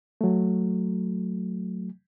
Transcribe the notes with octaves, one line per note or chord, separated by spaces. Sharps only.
F#3 A3